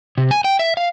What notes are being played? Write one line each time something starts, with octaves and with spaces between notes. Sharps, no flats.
C3
G#5
G5
E5
F5